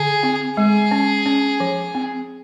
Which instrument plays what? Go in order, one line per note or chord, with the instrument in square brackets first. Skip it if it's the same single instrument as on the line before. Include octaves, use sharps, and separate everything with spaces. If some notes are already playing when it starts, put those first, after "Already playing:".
Already playing: [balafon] D3 [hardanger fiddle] G#4
[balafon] C4
[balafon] G#3 [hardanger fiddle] G#4
[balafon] C#4
C#4
F3
C4